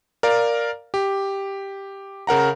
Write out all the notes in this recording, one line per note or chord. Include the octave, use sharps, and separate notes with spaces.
A#4 D5 F5
G4
C#3 A#4 F#5 A#5